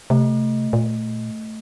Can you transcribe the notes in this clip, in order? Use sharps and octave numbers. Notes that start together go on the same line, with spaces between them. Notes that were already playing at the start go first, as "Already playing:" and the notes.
C3 A3
A#2